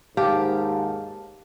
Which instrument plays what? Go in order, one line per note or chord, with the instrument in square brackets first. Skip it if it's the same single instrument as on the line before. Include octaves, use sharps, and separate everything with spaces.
[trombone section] D#2 G#2 [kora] G4 [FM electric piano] F5 A5